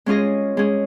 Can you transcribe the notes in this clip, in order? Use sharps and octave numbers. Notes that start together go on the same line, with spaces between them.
G#3 C#4 F4 G#4 D#5
G#3 C#4 G#4